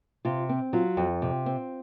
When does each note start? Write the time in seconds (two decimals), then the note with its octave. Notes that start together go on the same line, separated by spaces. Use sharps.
0.25 C3 F4
0.49 C4
0.73 F#3 F4
0.97 F2
1.22 C3
1.46 C4